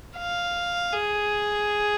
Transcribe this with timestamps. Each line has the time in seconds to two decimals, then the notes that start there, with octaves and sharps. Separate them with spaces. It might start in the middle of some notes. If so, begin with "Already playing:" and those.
0.18 F5
0.93 G#4